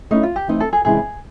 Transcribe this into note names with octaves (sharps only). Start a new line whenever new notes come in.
A3 C#4 D#4 E4
F4
G4
E3 A3 C4 D#4
A4
G#4
C3 E3 G#3 C#4 E4 G#4